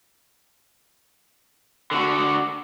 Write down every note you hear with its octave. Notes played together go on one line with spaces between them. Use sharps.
D3 F#4